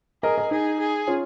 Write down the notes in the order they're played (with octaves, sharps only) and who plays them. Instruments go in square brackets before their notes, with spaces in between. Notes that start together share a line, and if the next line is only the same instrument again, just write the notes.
[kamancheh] G#4 [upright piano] A#4 D#5
[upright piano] A#4 D#5
[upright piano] D#4 [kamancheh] G#4
[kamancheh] G#4
[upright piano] C#4 F4